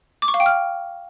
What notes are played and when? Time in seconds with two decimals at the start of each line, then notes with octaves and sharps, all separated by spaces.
0.22 D6
0.28 C#6
0.34 F5
0.40 G5
0.46 F6